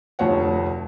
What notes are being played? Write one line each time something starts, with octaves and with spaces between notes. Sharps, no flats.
F1 D2 F3 C#5 F#5